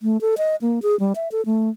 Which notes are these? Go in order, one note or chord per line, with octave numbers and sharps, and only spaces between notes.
A3
A4
D#5
A#3
G#4
G3
E5
A4
A3